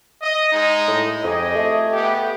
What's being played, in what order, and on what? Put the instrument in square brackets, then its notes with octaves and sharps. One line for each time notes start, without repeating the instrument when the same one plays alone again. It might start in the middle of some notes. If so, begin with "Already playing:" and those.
[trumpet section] D#5
G#3 D#4
[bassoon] A2
[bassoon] F2 [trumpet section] G4 G#4 D#5
[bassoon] A3
[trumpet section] B3 G4